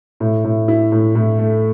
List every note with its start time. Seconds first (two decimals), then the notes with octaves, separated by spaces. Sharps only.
0.20 A2
0.44 A2
0.68 E4
0.92 A2
1.15 A2
1.39 A3